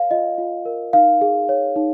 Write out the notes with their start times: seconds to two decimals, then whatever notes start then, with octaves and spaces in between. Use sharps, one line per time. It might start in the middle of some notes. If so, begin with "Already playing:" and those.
Already playing: A#4 C#5 F5
0.11 F4 D#5
0.38 F4
0.65 A#4
0.93 D#4 F5
1.21 G#4
1.49 C#5
1.76 D#4